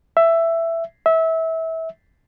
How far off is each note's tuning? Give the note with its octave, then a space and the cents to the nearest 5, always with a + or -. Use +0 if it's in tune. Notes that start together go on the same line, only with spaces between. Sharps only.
E5 +10
E5 -25